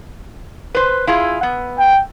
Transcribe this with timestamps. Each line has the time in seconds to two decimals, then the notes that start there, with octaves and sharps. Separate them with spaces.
0.75 B4 C5
1.07 E4 F4 G#4
1.43 B3
1.79 G5